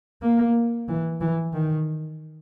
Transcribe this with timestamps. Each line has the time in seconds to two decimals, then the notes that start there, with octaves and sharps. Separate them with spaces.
0.23 A#3
0.88 E3
1.21 E3
1.53 D#3